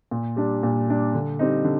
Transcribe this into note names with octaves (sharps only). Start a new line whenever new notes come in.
A#2
G3 D4
A#2
G3 D4
D3
G3 C4 D#4
D3